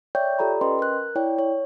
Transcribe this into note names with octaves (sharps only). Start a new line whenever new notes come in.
C#5 D5 E5 G5 C#6 G6
F4 G4 A4 D5 A#5 B5
C#4 B4 D#5 G5 C6
A#4 F#6
E4 C#5 D5 G5
C#5